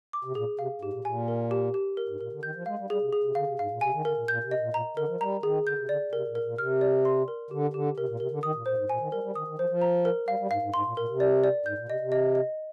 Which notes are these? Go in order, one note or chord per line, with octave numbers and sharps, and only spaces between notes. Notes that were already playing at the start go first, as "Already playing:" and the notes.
D6
C3
A#2 G#4
C3 F5
G#2 G4
A#2
A#2 G#5
A#4
G4
G4
A#4
G#2
A#2 A#4
D3
D#3 G6
F3
G#3 F5
G3
G3 G#4
C3
G#4
C3
D3 F5
C3
G#2 F5
A#2
C3 G#5
D#3
D3 A#4
A#2
A#2 G6
C3
D#5
A#2
A#2 A#5
D3 A#4
F3
G3 A#5
D#3 G#4
D3 G6
C3
D3 D5
C3 A#4
A#2
A#4
A#2
C3 F6
D5
C6
A#4
D3 G4
D3 G4
C3 A#4
A#2
C3 A#4
D3
D#3 D#6
A#2
A#2 C5
G#2
A#2 G#5
D#3
G3 A#4
G3
D#3 D#6
D#3
F3 C5
F3
A#5
A#4
G3 F5
G3
G#2 F5
G#2
G#2 C6
A#2
A#2 A#4
C3
D5
D5
G#2 G6
A#2
C3 D#5
C3
D#5
D#5